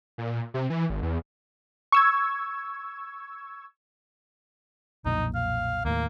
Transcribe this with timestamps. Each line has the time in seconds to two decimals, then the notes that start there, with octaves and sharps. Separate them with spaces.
0.18 A#2
0.54 C3
0.70 E3
0.90 G#1
1.02 E2
1.92 C#6 E6 G#6
5.05 B1 F2 A#2 D#4
5.35 F5
5.85 D#2 A2 A#3